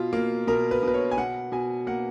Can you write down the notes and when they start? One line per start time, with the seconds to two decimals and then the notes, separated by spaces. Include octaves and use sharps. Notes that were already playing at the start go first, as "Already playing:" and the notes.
Already playing: B2 F4
0.13 A#3
0.47 B2 A#4
0.71 B4
0.83 B2 B4
0.94 C#5
1.11 G#5
1.18 B2 F#5
1.52 B2 G#5
1.87 A#3 F#5